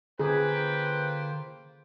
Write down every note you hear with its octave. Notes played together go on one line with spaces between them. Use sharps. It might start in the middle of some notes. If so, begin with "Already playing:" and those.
D3 A#3 F4 G#4 B4 C5 G5